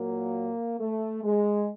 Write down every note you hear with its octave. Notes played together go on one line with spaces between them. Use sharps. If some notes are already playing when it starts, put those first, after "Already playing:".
Already playing: A#2 F#3 A#3
A3
G#3